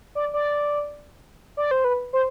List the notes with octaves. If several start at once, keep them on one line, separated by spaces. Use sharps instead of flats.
D5
D5
D5
C5
B4
C5